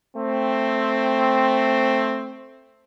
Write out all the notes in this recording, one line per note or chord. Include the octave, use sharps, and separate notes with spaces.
A3 C4